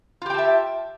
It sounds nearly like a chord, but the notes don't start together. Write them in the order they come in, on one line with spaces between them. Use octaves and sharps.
F4 G4 G5 A5 E5